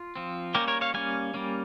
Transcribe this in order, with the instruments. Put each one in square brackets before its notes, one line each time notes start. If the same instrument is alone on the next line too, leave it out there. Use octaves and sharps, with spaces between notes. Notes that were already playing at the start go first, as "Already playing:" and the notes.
Already playing: [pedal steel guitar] F4
F3 C4
G3 A#3 C#4 G4 A#4
A#4 C#5
C#5 F5
G3 A#3 C#4 F5 G#5
G3 A#3 C#4